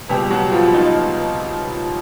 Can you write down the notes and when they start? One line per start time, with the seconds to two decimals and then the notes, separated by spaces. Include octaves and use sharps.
0.09 C#2 B2 G3 G4
0.30 F#3 F#4
0.52 F3 F4
0.74 D#4